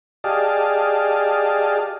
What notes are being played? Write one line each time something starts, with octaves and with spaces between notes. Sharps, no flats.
G4 G#4 D5 D#5 F5 A5